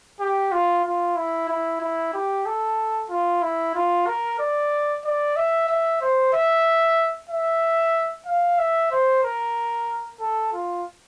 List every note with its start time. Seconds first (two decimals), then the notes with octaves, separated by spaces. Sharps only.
0.20 G4
0.52 F4
0.85 F4
1.16 E4
1.49 E4
1.81 E4
2.13 G4
2.46 A4
3.10 F4
3.42 E4
3.75 F4
4.07 A#4
4.39 D5
5.05 D5
5.36 E5
5.68 E5
6.02 C5
6.33 E5
7.29 E5
8.26 F5
8.58 E5
8.92 C5
9.24 A#4
10.20 A4
10.53 F4